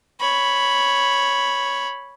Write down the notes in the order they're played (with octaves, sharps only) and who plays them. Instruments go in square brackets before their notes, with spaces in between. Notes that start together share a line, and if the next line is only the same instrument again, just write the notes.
[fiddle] C#5 B5